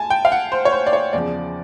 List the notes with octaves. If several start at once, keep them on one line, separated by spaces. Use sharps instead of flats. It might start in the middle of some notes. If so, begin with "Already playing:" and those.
Already playing: G#5 A5
G5
F5
F#5
C5
C#5
C5
D5
C#5
E2 C#3 F3 D5